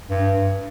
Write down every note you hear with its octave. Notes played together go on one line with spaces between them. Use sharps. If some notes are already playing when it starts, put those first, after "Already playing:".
G2